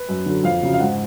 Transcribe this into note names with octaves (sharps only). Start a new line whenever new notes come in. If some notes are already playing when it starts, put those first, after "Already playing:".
Already playing: B4
F#2
D3 F#3
F2 F5
C#3 F#3
F5
G#2 F#5